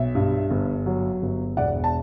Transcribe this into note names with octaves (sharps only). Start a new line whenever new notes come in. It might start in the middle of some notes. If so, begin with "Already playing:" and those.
Already playing: B1 E5
G2
G1
F#3
G1
E1 D5 F#5
A5